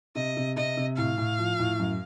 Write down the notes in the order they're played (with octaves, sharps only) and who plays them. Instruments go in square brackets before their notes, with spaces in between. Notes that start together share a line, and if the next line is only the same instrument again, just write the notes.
[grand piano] C3 [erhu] D#5
[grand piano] C3
[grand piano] C3 [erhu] D#5
[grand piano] C3
[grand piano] A2 [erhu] F5
[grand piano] A2
F3
A2
F#2